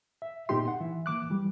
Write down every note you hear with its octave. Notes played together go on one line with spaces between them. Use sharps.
E5
A#2 B3 D#4 G4 C6
F#5
E3 E5
E3 A#3 D6 F#6
E3 G3